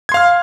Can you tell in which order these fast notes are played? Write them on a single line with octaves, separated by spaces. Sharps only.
G#6 C6 F5 F6